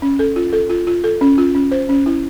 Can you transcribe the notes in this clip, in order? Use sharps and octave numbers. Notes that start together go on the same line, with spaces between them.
C#4
A4
F4
A4
F4
F4
A4
C#4
F4
C#4
C5
C#4
E4